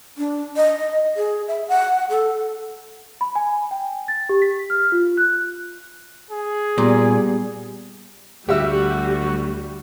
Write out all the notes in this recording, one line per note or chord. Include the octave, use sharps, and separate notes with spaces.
D4
D#5
G#4
E5
F#5
A4
B5
G#5
G5
A6
G4
B6
F6
F4
F#6
G#4
A#2 G3 B3
D2 G3 F#4 G4 E5 E6